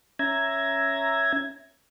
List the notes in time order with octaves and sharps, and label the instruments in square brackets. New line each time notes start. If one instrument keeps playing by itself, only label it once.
[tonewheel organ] C#4 E5 A#5 G#6